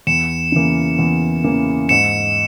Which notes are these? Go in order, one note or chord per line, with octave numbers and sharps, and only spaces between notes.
E2 C#7 E7
C#3 E3 A#3
E2
C#3 E3 A#3
G#2 C#7 E7